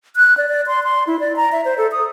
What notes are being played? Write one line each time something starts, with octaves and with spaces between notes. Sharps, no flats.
F#6
D5
D5
C6
C6
E4
D5
A#5
E5
C5
A4
D#6